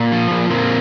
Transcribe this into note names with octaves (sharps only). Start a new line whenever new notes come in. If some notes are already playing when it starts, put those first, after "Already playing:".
Already playing: A#2
F3
A#2
A#2 A#3 C4